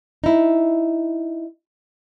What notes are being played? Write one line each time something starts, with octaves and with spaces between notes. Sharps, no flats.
D#4 E4